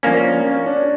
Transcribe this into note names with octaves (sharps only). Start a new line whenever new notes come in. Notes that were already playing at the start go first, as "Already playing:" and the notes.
F3 A#3 C#4 D4
C#4
D4